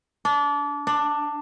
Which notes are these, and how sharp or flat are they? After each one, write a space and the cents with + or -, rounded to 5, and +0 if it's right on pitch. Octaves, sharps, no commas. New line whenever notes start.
D4 -25
D4 +10